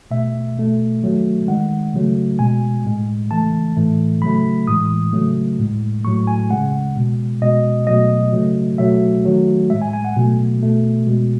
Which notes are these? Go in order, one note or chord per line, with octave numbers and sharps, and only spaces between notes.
B2 A3 E5
B2 A3
D#3 F#3 A3
D#3 G#3 F#5
C#3 F#3 A3
B2 G#3 G#5
A2 G#3
C#3 E3 A3 A5
A2 E3 A3
C#3 F#3 A3 B5
A2 E3 G#3 D#6
C#3 F#3 A3
A2 G#3
A2 F#3 A3 C#6
G#5
C#3 G#3 F#5
B2 G#3
B2 G#3 D#5
B2 F#3 A3 D#5
C#3 F#3 A3
B2 F#3 A3 E5
D#3 F#3 A3
A2 G#3 E5
G#5
G#5
F#5
B2 F#3 A3
B2 A3
B2 G#3